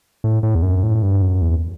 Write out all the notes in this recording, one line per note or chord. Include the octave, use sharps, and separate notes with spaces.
A2
A2
E2
F#2
A2
G2
F#2
E2